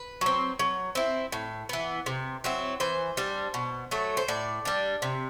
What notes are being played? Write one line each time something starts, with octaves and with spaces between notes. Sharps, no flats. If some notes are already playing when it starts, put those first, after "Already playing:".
Already playing: B4
F#3 C4
F#3
C4 E4
A2
E3 B3
C3
F#3 C4 E4
E3 C5
G3 D4
B2
F#3 A3
C5
A2 D5
G3 D4
C3